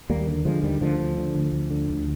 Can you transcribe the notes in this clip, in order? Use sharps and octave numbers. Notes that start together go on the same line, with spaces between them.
D#2 G3 A#3
D3
D3 F3 G#3
D#2 D#3 G3
D2 D3 F3
D3
D3
D2
D2
D3
D2